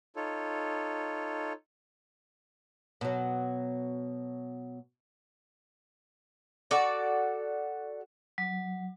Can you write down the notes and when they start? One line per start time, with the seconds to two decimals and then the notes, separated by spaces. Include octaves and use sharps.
0.16 D#4 F4 A4 C#5
3.01 B2 F#3
6.71 F#4 A4 D5
8.38 F#3